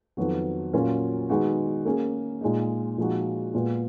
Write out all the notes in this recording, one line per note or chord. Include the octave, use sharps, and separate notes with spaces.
F2 D#3 F#3 B3 F#4
A#2 F#3 C#4 F4 A#4
D#3 G#3 B3 D#4 F#4
A#3 C#4 G#4
A#2 G#3 D#4
A#2 F3 G#3 D#4 F#4
A#2 G#3 B3